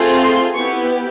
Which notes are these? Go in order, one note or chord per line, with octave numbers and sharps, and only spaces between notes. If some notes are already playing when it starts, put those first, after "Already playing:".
Already playing: A3 C4 F4 G#4
C6
B3 E4 G4 C#6